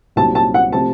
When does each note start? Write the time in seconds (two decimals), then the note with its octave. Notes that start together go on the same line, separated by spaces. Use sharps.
0.16 C2 A#2 F#3 C4 D#4 A5
0.35 A5
0.54 F#5
0.72 C3 F3 A3 C4 A5